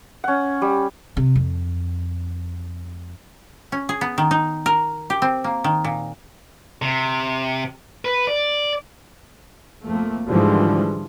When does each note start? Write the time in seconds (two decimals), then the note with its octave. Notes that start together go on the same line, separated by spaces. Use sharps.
0.24 C#4 F#5
0.62 G3
1.17 C3
1.35 F2
3.72 C#4
3.89 G#4
4.01 B3
4.18 D#3
4.31 D#4
4.66 A#4
5.10 G4
5.22 C4
5.44 A#3
5.64 D#3
5.84 A#2
6.82 C3
8.05 B4
8.27 D5
9.84 F2 A3 A#3
10.27 G#2 D3 E3 F3 G3 G#3